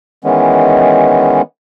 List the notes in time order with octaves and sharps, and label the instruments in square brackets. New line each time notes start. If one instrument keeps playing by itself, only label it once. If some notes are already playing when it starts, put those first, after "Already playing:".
[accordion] D#3 E3 G#3 B3 C#4